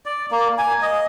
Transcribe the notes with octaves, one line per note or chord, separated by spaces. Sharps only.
D5
A#3
G#5
D#5